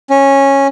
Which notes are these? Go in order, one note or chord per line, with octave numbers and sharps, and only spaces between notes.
C#4